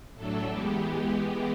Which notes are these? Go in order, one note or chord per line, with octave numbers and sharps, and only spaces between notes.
A2 F#3 A3 D4 A4
E3 G#3 B3 G4